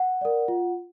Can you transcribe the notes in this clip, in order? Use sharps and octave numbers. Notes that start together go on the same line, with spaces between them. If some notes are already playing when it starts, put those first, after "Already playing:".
Already playing: F#5
A#4 D5
F4